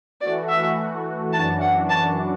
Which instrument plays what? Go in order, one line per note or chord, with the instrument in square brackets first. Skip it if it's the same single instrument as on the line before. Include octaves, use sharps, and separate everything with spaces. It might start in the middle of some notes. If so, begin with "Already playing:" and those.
[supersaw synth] E3 A3 F#4 [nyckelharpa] D5
[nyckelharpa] E5
[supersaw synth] F#2 E3 D4 F#4 [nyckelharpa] A5
[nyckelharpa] F#5
A5